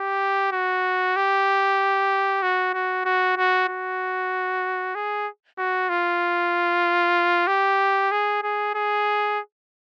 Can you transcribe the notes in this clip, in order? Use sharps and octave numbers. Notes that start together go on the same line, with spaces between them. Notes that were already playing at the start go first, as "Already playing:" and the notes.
Already playing: G4
F#4
G4
F#4
F#4
F#4
F#4
F#4
G#4
F#4
F4
G4
G#4
G#4
G#4